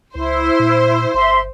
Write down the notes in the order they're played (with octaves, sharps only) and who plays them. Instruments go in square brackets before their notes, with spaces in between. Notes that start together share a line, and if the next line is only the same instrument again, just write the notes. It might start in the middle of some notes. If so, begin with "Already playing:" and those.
[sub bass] C#2 [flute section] E4 [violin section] C5
[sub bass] A#2
[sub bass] G1 [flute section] E5 C6